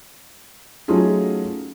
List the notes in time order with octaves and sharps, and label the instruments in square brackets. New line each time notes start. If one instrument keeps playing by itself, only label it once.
[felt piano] F#3 A3 C#4 D#4 F4 G#4